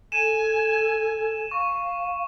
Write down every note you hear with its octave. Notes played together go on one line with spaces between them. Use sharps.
A4 G#5 D#7 E7
F5 C#6